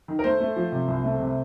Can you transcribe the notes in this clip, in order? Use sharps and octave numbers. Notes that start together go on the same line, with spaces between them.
D#3
A#4
A3 C5
A3
F3
C3
C2
A3
C3